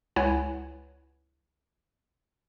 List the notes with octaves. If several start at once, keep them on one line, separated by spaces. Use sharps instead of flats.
C#2 E4 B4 C#5 F#5 G#5